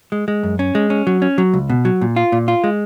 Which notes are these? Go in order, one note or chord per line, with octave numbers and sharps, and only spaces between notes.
G#3
G#3
F#2
C#4
G#3
C#4
F#3
C#4
F#3
C#2
B2
F#3
A#2
F4
A#2
F4
G#3